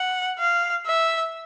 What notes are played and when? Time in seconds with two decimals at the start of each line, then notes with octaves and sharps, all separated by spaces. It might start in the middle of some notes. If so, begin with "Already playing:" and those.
Already playing: F#5
0.39 F5
0.86 E5